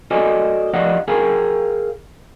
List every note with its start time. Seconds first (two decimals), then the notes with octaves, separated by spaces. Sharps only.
0.11 F#4 A4 C5 D5 D#5 G#5
0.74 F3 G4 D5 D#5 F5 F#5
1.08 G#4 A#4 F5 G5 G#5